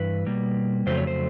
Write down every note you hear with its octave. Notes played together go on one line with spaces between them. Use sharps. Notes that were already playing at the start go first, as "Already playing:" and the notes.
Already playing: G2 E3 B4
B2 G3 A#3
F2 C#3 F#3 A3 C5
C#5
C5